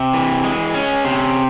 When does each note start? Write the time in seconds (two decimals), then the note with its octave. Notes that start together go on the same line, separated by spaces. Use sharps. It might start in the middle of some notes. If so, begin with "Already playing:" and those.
Already playing: C3
0.13 E3
0.44 G#3
0.74 C#4
1.05 C3